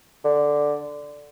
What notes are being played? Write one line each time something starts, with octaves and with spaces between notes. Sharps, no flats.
D3